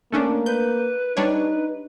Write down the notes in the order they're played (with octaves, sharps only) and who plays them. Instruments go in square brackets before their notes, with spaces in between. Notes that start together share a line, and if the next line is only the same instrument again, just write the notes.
[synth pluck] A3 C#4 D4 [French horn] A#3
[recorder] B4 [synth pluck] G6
[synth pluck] G3 D4 C#5 [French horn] D#4